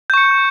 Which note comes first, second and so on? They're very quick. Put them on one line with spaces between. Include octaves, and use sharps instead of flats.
G6 C#6 C#7